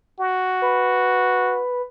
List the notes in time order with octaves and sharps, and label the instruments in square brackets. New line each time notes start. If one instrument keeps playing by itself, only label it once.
[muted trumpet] F#4
[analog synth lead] B4